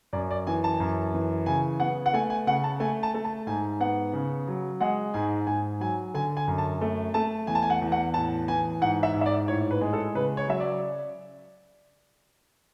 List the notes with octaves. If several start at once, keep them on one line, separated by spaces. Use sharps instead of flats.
F#2 D5
D5
E3 G#5
A5
F#2
E3
C#3 G#5
B3 F#5
F#5
A3 G#5
G#5
C#3 F#5
A5
A3 G#5
A5
A3
A5
G#2 G#5
B3 F#5
C#3
F#3
G#3 F#5
G#2 G#5
G#2 G#5
F#3 G#5
D3 G#5
G#5
F#2
A5
A3
A3 A5
E2 G#5
A5
G#5
F#5
E2
F#5
A2 A5
E3 G#5
G#2 F#5
E5
G#2
E5
D5
A2 C#5
B4
G#3
A4
C#3 B4
C#5
F#3 E5
D5